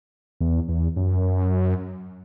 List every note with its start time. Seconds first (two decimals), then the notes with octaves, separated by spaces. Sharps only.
0.40 E2
0.69 E2
0.96 F#2